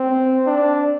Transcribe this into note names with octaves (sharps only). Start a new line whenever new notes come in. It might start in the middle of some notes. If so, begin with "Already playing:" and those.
Already playing: C4
D4